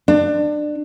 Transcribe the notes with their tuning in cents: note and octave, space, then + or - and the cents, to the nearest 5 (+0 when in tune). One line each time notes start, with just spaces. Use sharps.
D4 +25